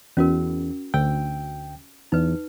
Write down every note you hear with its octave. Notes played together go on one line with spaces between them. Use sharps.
E2 C#4 F#4 A#4
D2 G5 E6
E2 D#4 B4